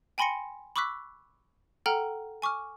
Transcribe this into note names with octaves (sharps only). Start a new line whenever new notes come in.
G5 G#5 B5 C6 A#6 C#7
B5 C#6 D6 E6 F#6 B6
A4 F#5 G5 A#5 F6
G#5 C#6 D6 F6